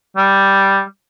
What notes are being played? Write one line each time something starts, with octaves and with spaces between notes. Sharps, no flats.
G3